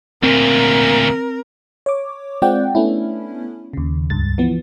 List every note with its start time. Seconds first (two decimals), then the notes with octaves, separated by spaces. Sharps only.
0.23 D2 A#2 C4 A#4
1.86 C#5 D6
2.42 G#3 C4 F4 D5 F#5 G5
2.75 A3 B3 C#4 D4 E4
3.73 D#2 C#3
4.10 C#2 G2 A6
4.38 E3 F3 B3